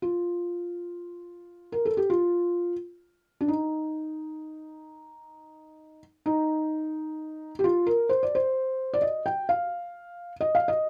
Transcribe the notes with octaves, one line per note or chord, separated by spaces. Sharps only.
F4
A#4
A4
G4
F4
D4
D#4
D#4
G4
F4
A#4
C5
D5
C5
D5
D#5
G5
F5
D#5
F5
D#5